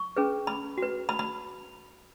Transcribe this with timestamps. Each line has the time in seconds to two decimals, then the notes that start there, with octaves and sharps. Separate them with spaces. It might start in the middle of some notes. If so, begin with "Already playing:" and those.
Already playing: C#6
0.17 C#4 G#4 B4
0.47 B5
0.78 F#4 B4
1.09 B5
1.19 B5